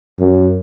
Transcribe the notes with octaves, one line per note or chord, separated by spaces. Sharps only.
F#2